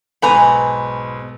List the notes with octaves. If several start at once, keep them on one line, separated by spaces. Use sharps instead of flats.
B1 G#2 B4 G#5 A#5 B5